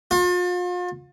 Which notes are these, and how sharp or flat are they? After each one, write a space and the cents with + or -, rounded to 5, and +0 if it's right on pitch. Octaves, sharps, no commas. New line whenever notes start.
F4 +40